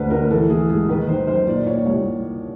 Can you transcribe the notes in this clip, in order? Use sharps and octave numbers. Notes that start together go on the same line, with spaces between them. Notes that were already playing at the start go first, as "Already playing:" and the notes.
Already playing: D2 D3 B4 C5
D2 A#4
E3 A4
E3 G#4
G#2 G#4
D#3 B4
D#3 C5
F#2 C5
A#2 D5
A#2 C#5
C2 C#5